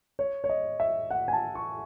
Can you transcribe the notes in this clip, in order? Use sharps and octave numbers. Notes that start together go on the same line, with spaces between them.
C#5
C#5
D#5
E5
F#5
G#5
A5
C#6